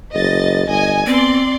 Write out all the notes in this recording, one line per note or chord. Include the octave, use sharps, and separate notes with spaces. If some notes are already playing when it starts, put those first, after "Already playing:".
F#1 D#5 A6
G1 D#5 G#5
B3 C4 D5 C6